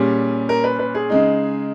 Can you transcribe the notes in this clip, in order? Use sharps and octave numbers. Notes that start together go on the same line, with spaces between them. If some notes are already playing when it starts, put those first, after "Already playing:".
Already playing: A#2 G3 C#4 G#4
A#4
B4
B4
G#4
C#3 G#3 D#4